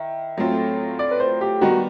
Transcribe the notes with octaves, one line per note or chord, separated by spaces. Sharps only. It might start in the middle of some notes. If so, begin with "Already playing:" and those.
Already playing: D#3 E4 E5
A2 F#3 A3 C4 F4
D5
B4
C5
G4
D#3 G3 B3 D#4 F#4